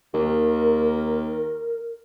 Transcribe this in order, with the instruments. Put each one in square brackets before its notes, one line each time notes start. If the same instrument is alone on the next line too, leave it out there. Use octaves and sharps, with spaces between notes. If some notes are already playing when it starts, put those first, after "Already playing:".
[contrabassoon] D#2 [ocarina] A#4